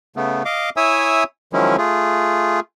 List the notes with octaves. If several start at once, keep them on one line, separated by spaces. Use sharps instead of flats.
C#3 A3 B3
D#5 F5 D6
E4 C#5 E5 G#5 D#6 E6
D#3 F3 F#3 G#3 C#4 E4
A3 F4 G#4